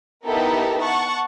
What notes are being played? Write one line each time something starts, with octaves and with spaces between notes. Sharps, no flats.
B3 D#4 E4 G4 A4 A#4
F#5 A5 C#6